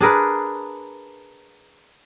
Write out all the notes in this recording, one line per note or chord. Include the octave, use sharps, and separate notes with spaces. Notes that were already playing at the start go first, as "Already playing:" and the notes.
D4 G#4 A#4 B4